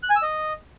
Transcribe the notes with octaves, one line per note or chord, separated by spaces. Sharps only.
F#6
G#5
E6
D#5